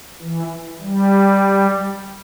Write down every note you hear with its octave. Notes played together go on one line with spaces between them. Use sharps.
E3
G3